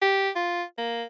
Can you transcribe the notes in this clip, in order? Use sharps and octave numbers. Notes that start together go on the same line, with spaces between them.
G4
F4
A#3